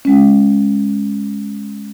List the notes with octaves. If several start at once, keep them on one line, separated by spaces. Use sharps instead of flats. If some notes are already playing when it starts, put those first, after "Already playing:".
G#3 C#4